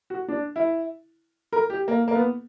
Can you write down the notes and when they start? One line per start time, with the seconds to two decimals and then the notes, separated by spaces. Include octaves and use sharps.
0.10 F#4
0.28 D4
0.56 E4
1.53 A#4
1.70 G4
1.88 A#3
2.08 A#3
2.15 B3